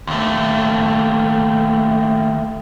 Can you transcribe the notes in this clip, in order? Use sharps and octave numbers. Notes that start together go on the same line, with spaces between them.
D#2 A3